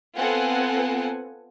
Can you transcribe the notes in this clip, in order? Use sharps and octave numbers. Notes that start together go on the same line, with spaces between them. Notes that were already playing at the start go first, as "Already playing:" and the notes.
B3 C4 F4 A4 F#5 G#5